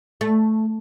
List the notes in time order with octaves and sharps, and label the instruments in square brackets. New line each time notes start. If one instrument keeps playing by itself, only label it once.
[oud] A3